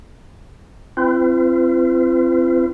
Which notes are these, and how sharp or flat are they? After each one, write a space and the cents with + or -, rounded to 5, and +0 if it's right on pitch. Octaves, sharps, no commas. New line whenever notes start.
C4 +0 F4 -45 B4 +45